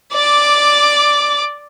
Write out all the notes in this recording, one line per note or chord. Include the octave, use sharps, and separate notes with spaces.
D5 D6